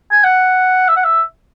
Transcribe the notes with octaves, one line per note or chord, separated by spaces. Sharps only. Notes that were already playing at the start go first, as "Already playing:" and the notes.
G#5
F#5
E5
F#5
E5